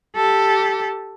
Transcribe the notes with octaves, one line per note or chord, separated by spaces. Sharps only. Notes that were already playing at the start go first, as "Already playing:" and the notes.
G4 A4